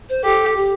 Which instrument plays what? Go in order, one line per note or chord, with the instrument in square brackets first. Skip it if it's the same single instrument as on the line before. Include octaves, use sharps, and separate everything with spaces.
[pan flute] C5
[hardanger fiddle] G4 [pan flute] A4
[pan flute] G4